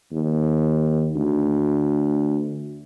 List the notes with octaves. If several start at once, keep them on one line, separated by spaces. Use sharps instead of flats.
D#2
D2